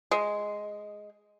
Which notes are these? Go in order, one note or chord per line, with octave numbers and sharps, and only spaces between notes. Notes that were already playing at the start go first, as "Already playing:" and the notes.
G#3